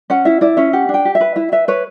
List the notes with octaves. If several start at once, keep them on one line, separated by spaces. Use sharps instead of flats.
C#4 F#5
E4 E5
E4 D5
C#4 E5
G4 F#5
D4
G5
G4
E5
B4
E4 E5
B4 E5
B4 C#5